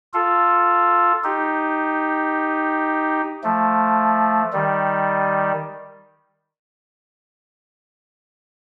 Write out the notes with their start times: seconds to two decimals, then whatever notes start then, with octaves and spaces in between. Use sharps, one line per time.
0.14 F4 A4
1.24 D#4 G4
3.44 F3 A3
4.53 D#3 G3